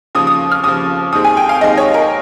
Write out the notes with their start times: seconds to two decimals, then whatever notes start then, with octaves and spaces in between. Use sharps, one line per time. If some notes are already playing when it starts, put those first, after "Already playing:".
0.15 D#2 C#3 F3 D#6
0.27 D#6
0.52 F6
0.63 D#2 C#3 F3 D#6
1.12 D#2 D#3 G#3 C4 D#6
1.25 G#5
1.37 G5
1.49 F5
1.61 D#2 D#3 G#3 C4 D#5
1.77 C#5
1.94 A#4